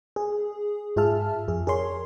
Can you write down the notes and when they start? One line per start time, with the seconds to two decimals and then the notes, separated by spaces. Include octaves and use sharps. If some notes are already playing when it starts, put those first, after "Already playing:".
0.16 G#4
0.96 G#2 F4 G#4 E5 A5 F6
1.48 F2 G#4
1.67 G#4 A#4 C#5 C6